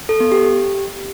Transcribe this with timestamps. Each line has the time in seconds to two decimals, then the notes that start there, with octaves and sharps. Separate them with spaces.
0.09 A4
0.20 B3
0.32 G4